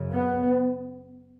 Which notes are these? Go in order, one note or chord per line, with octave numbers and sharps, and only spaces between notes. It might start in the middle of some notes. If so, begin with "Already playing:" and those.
Already playing: F#2 C#3
B3